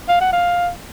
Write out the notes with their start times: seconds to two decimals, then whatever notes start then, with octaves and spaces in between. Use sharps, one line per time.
0.09 F5
0.21 F#5
0.33 F5